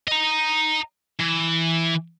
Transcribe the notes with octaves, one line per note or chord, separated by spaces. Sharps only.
D#5 A#5
E3